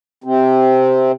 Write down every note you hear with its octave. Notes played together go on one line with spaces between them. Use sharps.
C3 C4